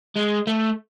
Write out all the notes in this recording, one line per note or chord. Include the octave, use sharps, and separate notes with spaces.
G#3
A3